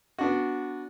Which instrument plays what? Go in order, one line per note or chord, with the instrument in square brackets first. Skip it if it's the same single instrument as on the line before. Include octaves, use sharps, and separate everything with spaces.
[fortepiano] B3 D4 F#4